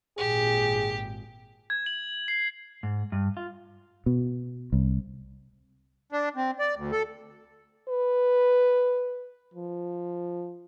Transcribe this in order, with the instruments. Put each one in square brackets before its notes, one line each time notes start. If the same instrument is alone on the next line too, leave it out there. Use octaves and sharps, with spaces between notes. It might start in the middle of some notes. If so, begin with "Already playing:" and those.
[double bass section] G#1 A#2 [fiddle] G4 [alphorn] G#4
[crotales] G#6
F#7
C7
[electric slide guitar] G#2
G2
F4
[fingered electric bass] B2
C2
[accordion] D4
C4
D5
D2
A4
[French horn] B4
F3